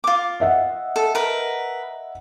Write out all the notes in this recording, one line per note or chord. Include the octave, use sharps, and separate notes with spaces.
F4 D6
D#5 E5 F#5
A4
A#4 B4